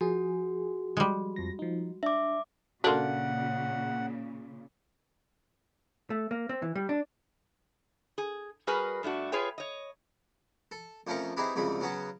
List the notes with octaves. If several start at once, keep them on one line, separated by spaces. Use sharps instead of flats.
F3 F#4 G#4
G3 G#3
F2 F3 A#6
F3 D#4
D4 E5 D6
A#2 C#3 A#3 D4 F#4 A4 F#5 C6
A3
A#3
C4
E3
G3
D4
G#4
G3 F#4 G#4 A#4 B4
G2 A3 D4 F#4
F4 G#4 B4 C#5 G5
C#5 D#5
A4
F2 F3 A3 C#4 A#4 C#6
C4 D#4 E4 G4 G#4 B4
C2 F2 G#2 C#3 B5
C#3 F#3 B3 C#4 F#4